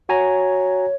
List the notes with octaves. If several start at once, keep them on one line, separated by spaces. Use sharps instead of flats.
F#4 C#5 G#5 A#5